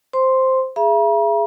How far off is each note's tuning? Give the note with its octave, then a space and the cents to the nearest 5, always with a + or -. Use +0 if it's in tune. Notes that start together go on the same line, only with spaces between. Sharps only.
C5 +0 C6 +0
G#4 +0 E5 +40 A#5 +45